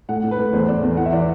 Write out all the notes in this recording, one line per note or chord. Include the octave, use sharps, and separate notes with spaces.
A2 F#5
A2
B4
A2
E2 C5
E2 D5
E2
E3 F#5
E5
E3 D5